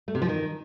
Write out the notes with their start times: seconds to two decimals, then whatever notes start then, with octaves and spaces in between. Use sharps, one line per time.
0.08 A3
0.15 C3
0.22 F3
0.29 D#3